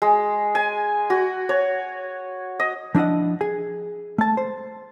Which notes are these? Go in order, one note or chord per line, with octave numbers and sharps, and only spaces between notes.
G#3
G#5
F#4
C#5
D#5
F3 D4 E4 D#5 F#5
G#4 G#5
A3 A5
C5